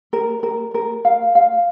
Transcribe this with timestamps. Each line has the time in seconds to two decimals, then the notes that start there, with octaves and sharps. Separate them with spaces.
0.13 A#4
0.43 A#4
0.74 A#4
1.05 F5
1.35 F5